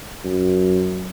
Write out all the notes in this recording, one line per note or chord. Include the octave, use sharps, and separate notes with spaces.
F#2